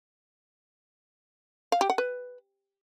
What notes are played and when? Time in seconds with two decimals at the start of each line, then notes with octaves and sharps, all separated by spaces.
1.72 F5
1.81 G4
1.90 F#5
1.98 B4